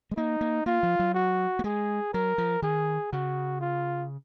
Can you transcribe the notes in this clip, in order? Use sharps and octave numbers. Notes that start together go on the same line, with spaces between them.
G#3
A#3 D#4
A#3
A#3 F4
F3
F#3
F#4
A#3
G#3 G#4
F#3 A#4
F3
D#3 G#4
C#3 F#4
F4